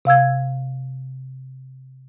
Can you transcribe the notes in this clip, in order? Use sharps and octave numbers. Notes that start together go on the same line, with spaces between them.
C3 F5 E6 G#6